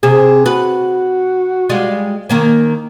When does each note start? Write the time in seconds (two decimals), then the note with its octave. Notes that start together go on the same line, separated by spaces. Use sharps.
0.03 C3 G#4
0.46 F#4 B4
1.69 G3 G#3 F4
2.29 D#3 A#3 C#4